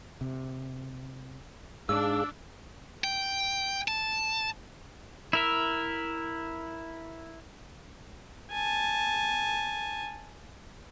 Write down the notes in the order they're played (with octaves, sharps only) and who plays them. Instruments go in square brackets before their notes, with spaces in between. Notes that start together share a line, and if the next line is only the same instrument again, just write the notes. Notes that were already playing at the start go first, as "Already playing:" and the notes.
[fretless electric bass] C3
[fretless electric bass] G#2 [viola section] D4 [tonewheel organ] G#4 F5 [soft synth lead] E6
[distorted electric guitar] G5
A5
[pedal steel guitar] E4 A#4 E5
[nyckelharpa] G#5 A5